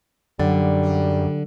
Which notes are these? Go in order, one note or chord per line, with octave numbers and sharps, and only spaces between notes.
F#2 D3 F#3 G3